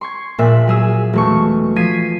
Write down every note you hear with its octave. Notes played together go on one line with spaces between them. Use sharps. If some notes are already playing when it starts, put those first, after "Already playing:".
C6 C#6 G#6
A#1 A#2 E5 F#6 B6
F#3 G#4 E6
E1 A3 C#6
F3 G#6 B6 C7 D#7